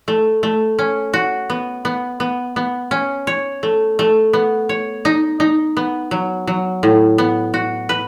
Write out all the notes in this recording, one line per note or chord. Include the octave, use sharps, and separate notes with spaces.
A3
A3
C#4
F#4
B3
B3
B3
B3
C#4
C#5
A3
A3
B3
C#5
D#4
D#4
B3
F#3
F#3
A2
B3
F#4
B4